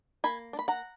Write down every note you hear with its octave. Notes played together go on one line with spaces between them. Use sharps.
A#3 G#5 B5
D4
B5
F#5 A#5